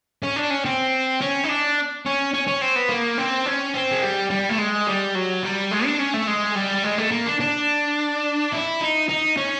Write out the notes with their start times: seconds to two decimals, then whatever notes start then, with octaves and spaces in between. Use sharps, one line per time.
0.23 C#4
0.36 D4
0.50 C#4
0.65 C4
1.21 C#4
1.44 D#4
1.49 D4
2.05 C#4
2.34 C#4
2.47 C#4
2.61 C4
2.76 B3
2.89 A#3
3.18 C4
3.46 C#4
3.74 C4
3.92 G#3
4.02 G3
4.31 G3
4.49 A3
4.58 G#3
4.87 G3
5.15 F#3
5.43 G3
5.71 G#3
5.85 D4
5.99 C#4
6.14 A3
6.28 G#3
6.55 G3
6.84 G#3
6.98 A3
7.11 A#3
7.26 D4
7.40 D4
8.52 E4
8.81 D#4
9.09 D#4
9.37 C#4